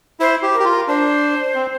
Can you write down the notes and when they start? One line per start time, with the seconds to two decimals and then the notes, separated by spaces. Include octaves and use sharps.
0.20 E4 C5
0.42 G4
0.54 A#4
0.60 G4
0.65 F4
0.71 A#4
0.88 D4 C5
1.55 C4